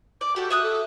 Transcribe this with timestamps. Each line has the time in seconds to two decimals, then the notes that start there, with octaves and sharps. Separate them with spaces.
0.21 D5 D6
0.36 F#4 G4 A4
0.50 E5 D#6 F#6
0.63 A4